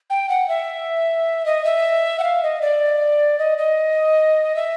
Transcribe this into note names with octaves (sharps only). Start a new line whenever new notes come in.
G5
F#5
E5
D#5
E5
F#5
F5
D#5
D5
D#5
D#5
E5